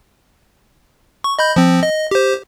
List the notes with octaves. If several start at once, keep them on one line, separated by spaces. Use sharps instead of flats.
C#6
D#5 B5 G6
F3 C4
D#5
G4 C5